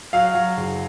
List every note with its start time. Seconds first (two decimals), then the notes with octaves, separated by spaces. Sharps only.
0.13 F#3 F5
0.35 F#3
0.57 F#1